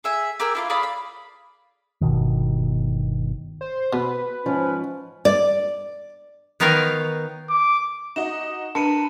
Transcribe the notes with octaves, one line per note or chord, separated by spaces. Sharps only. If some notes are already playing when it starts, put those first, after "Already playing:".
G#4 E5 G#5
G4 G#4 A#4 E6
E4 F4 D6
G#4 D5 F5 B5
B5
G1 C2 B2 D#3
C5
B2 B4
G#2 F3 C#4
D5
D#3 B3 D#4 A#4 C#5 F5
D6
D#4 F#4 D#5 E7
D4 A#4 B4 A5 C#7 D#7